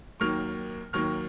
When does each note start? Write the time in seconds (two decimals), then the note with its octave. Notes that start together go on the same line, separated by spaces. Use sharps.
0.20 D#2 D#3 F#3 A#3 C#6 F6
0.93 D#2 D#3 F#3 A#3 C#6 F6